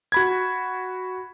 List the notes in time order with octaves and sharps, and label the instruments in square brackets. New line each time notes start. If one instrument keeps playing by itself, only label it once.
[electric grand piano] F#4 B5 G#6